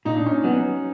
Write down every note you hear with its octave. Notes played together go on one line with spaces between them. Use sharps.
A#2 D#4
D4
C#4 D#4
F#3 B3